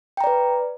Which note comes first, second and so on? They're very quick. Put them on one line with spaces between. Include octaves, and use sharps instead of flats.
G5 A#5 D5 B4